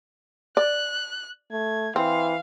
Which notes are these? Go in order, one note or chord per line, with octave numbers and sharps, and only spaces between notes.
D5 F#6
A3 G#6
E3 C4 F5